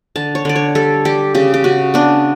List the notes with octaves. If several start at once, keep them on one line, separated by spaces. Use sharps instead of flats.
D3 A5
C#5
D3 D5
C#5
G3 A4
G3 G4
C#3 G4
G4
C#3 F#4
B3 D4